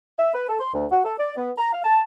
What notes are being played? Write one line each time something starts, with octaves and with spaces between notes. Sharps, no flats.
E5
B4
A4
C6
D2
F#4
A4
D5
B3
A#5
F5
A5